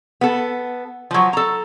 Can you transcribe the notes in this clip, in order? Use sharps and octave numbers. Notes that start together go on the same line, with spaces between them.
B3 A4
F3 F#3
A4 A#5